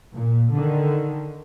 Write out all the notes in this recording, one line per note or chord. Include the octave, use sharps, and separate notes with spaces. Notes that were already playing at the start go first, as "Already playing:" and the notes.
A#2
D3 D#3